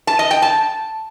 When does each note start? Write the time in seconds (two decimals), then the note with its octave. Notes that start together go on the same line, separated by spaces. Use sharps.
0.07 A5
0.19 D#5
0.31 G5
0.42 A5